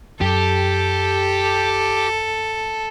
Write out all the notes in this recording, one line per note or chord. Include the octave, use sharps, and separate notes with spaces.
F#2 G4 A4